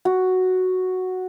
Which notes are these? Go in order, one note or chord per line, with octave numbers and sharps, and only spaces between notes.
F#4